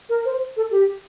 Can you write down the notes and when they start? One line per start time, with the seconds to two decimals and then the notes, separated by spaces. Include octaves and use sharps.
0.09 A#4
0.25 C5
0.57 A4
0.71 G4